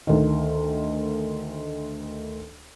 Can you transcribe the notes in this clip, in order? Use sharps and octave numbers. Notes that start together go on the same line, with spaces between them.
D2 D#3